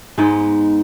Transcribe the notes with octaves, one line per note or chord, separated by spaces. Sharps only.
G#2 G#3 B3 D#4